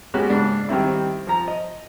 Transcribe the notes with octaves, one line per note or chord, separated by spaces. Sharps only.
G#3 A#3 B3 C#4 F#4 G4
G#2 C#3 D4
D#3 G3 C4 E4
F3 A#5
D#5